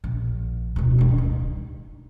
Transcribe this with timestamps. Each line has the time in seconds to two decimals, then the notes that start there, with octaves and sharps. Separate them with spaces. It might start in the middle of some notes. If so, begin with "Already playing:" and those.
0.04 A#1
0.76 D1 B2
0.98 G2 D#3
1.18 D#4